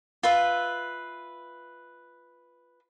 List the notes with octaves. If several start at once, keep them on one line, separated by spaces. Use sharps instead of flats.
F4 B4 E5